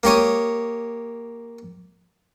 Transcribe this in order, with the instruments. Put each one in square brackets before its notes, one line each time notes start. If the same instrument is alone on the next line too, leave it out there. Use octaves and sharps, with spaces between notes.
[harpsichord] A#3 G4 C#5 D#6